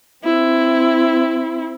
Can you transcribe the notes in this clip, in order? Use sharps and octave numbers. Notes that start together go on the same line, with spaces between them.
C4 E4